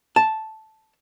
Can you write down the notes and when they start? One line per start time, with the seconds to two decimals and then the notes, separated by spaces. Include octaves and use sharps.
0.16 A5